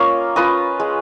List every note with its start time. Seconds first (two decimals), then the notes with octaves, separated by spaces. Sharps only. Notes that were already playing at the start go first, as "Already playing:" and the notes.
Already playing: A#3 C#4 F4 C#5 D#5 F5
0.36 C#4 F4 B4 D#5
0.80 G#3